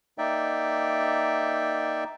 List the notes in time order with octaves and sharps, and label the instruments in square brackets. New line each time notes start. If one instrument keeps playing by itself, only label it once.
[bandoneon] A#3 D#4 D5 E5 G5